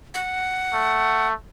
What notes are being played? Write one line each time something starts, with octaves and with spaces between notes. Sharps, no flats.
F#5
A3